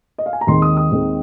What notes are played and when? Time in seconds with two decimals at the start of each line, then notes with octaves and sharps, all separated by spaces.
0.18 D#5
0.26 F5
0.33 G#5
0.41 A#5
0.47 D#2 D#3 G#3 C4 C6
0.62 D#6
0.77 D#6
0.91 D#2 D#3 G#3 C4